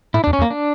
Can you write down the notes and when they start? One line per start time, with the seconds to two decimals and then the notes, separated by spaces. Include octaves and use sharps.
0.14 A2 E4
0.24 E2 D4
0.33 C#4
0.39 E2
0.42 A#3
0.50 D4